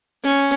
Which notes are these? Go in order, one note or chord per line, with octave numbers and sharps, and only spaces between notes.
C#4